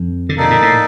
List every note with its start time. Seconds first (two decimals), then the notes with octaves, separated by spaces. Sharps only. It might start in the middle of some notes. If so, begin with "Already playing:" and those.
Already playing: F2
0.29 D3
0.37 C3 A#3 D#4 A4 D5
0.50 A#2
0.62 A2